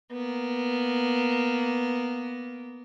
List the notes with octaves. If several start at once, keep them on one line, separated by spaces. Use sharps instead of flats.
A#3 B3